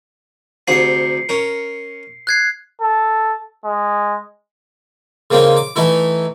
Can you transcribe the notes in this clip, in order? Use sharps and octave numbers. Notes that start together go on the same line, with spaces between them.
D2 C3 G#4 C7 C#7
C#4 A#4
F#6 G#6 C7
A4
G#3
C#3 A#3 C4 D#4
D6
E3 A3 D#4 E4